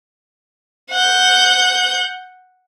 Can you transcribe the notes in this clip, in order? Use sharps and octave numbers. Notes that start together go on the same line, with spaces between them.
F#5 G6